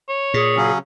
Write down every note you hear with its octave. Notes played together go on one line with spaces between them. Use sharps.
C#5
A#2 G#4
C#3 F#3 C#4